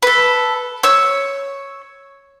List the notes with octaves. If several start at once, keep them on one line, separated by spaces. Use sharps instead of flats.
A4 B4
C#5 E6